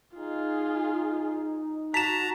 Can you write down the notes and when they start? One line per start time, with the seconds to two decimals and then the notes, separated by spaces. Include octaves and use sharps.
0.17 D#4 F4 G#4
1.94 F#4 A5 A#5 B6 E7